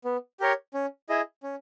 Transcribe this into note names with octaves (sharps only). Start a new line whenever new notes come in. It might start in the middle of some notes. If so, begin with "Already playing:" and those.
B3
G4 A#4 C#5
C#4
E4 G#4 D#5
C#4